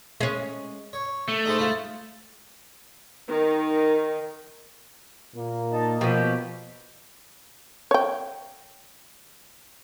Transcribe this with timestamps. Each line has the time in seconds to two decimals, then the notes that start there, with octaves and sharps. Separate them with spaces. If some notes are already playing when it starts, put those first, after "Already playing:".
0.20 G#3 C#4
0.93 C#5
1.28 A3
1.45 D#4 G#4 C5
1.58 E4 F4
3.29 D#3
5.35 A#2 A#3
5.72 D#4 A5
6.01 B2 F3 B3 G4
7.91 C#5 G5